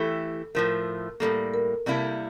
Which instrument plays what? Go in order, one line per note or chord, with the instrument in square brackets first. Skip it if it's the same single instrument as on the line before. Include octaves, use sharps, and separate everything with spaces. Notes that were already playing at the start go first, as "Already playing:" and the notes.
Already playing: [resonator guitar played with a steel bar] E3 A3 E4 G4 [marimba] A4
[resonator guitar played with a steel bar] A2 F3 A3 [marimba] A#4
[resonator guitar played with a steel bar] A2 E3 G3 A#3 [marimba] A4
[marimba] A#4
[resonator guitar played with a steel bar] C3 G3 A#3 E4 A4